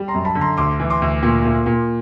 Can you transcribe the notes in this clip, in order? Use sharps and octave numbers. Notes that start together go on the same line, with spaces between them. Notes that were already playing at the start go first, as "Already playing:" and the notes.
Already playing: G3
A#5 C6
F#2
A5 B5
D3
A#5 C6
D2 C6 D6
E3
C6 D6
D2
A#2
A#2
A#2